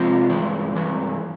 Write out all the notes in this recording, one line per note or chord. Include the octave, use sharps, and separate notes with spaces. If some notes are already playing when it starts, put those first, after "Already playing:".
Already playing: C3 F3 G#3
G2 E3 G#3
G2 E3 G#3